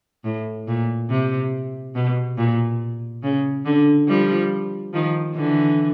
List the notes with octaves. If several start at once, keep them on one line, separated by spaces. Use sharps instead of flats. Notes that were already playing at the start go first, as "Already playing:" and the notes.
A2
A#2
C3
B2
A#2
C#3
D3
F3 G3
D#3 F3
D3 E3